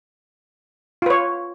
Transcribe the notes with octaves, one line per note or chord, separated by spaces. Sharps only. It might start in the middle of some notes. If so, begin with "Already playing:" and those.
F4 B4 C#5